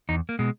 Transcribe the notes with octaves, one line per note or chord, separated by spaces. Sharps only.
E2 D#4
A#3
B2 G#3